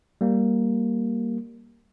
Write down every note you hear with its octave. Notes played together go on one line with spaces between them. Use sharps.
G3 A#3